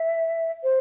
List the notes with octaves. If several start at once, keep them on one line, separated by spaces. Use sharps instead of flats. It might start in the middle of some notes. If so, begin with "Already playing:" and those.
Already playing: E5
C5